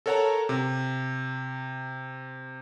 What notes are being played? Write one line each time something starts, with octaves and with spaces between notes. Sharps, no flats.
A4 A#4 C#5 F#5 A5 A#5
C3